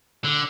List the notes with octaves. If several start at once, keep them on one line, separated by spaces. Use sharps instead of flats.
D3